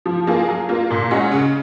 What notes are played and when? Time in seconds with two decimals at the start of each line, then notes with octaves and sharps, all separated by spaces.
0.06 F3
0.27 A#3 F4 G#4
0.48 F#3
0.69 A#3 F4
0.90 A#2
1.11 G#3 C#4 F#4
1.31 C#3